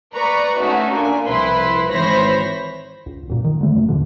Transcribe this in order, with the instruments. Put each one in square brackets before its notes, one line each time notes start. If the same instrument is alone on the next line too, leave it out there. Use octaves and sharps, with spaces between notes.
[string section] B4 D5 A#5 C#6
A3 C#4 D#4 F#4
A#2 D4 G#5
C2 F3 E4 B4 B5 C6
G#1 E3 C5 C#5 B5 A#6
[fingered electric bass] C#2
D1 F#2 A#2
D#3
D3 A3
F1 C#2 F#2
D#1 E2 A2 D3